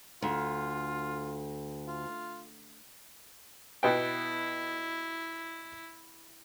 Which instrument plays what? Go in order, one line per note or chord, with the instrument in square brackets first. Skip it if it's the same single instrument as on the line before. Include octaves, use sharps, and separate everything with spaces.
[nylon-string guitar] D2 [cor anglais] F4
[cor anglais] F4
[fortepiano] B2 B3 G5 [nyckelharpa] E4